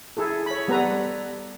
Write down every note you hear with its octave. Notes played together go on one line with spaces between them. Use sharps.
E4 G#4 A4
C#5 B5
G3 B3 A4 B4 A#5